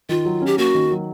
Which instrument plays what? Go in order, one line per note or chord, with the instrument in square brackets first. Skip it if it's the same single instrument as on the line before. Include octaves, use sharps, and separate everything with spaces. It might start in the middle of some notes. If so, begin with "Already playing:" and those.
[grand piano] D#3 [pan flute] F4
[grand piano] F#3
[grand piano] C#4 [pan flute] G4
[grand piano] A#3 [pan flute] F#4
[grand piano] D#3
F#3